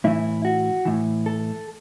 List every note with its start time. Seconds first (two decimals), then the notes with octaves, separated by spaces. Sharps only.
0.04 A2 E3 E4
0.45 F#4
0.85 A2 E3
1.26 A4